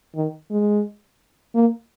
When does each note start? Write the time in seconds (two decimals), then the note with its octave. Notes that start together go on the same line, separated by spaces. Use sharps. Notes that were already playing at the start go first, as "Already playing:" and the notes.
0.15 D#3
0.51 G#3
1.55 A#3